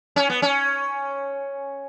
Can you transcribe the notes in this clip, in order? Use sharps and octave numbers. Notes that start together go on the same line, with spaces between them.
C#4
B3
C#4